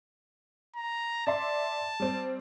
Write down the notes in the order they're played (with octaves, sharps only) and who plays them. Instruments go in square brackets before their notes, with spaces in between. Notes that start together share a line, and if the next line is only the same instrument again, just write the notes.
[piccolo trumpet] A#5
[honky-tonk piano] D5 E5 C6 [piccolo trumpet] A5
[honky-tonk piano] G3 C4